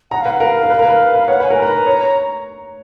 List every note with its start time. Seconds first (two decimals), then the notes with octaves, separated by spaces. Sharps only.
0.11 F#5 A#5
0.21 B4 F5
0.30 F#5
0.40 A#4 F5
0.55 F5
0.63 A#4
0.70 B4
0.79 A#4
0.89 B4
1.14 B4
1.28 C#5 F#5
1.40 B4 G#5
1.51 A#4
1.58 B4 A#5
1.87 C#5